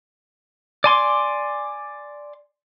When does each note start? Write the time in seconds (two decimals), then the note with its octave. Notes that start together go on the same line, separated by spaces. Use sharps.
0.84 D5 G#5 C6 D6